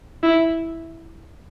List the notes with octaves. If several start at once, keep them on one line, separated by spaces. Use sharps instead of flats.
E4